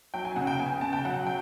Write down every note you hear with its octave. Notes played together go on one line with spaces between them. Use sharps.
F#3 G5
G#5
C#3 F#5
G5
B3 G#5
G#5
C#3 A5
G5
F#3 F#5
G5